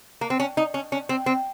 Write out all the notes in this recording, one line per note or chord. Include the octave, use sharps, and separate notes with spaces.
A#3
C4
C#4
D#4
C#4
C#4
C4
C4